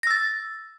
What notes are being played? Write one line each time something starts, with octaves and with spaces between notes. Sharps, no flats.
E6 A6 A#6